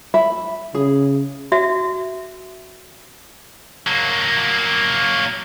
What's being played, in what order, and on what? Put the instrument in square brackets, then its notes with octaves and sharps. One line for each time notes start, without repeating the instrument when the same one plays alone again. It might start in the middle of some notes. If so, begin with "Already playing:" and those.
[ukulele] E5 B5
[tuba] C#3 [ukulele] G#4
[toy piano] F#4 E5
[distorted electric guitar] F#3 A#3